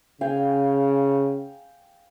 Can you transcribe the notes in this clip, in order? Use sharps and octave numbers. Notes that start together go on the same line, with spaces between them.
C#3 F5 G5 G#5